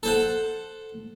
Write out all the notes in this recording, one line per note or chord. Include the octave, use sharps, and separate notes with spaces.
A4 C5 F#5